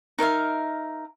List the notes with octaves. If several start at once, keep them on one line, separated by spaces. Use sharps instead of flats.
D#4 A#4 E5 F5